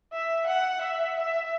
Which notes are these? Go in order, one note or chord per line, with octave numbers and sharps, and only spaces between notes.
E5
F#5
E5
E5